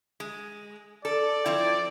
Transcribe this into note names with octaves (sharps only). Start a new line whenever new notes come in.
G#3
A4 D5
F3 C4 E4